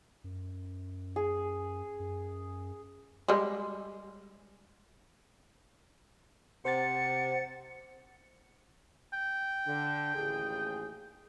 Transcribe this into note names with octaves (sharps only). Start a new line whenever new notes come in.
F#2
G#4
F#2
G3 G#3
C3 C5 F#5 A6 C#7
G5
D3
A1 D#2 G#4